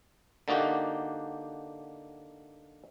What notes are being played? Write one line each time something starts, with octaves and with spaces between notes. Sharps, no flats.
D3 A#3 D#4 F#4 G4